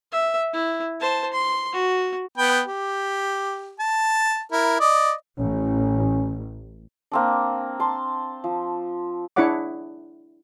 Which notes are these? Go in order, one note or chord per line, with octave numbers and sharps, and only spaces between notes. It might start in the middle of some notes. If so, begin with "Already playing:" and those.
E5
E4
C5 A5
C6
F#4
B3 G5 B5
G4
A5
E4 A#4
D5 D#5
A1 C#4
A#3 C4 D4
A5 C6
F3
D4 E4 G#4 C#5 F#5 D6